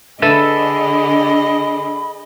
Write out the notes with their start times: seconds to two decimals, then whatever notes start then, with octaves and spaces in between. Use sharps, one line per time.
0.22 D3 G#4 A4 B4 D#5 E5 B5